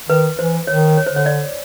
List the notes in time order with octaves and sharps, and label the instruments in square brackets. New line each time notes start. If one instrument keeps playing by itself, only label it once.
[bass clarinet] D#3 [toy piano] B4
[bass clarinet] E3 [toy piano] C5
[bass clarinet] D#3 [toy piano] C#5
[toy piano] C#5
C5
[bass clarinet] D3 [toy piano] C#5
[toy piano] D5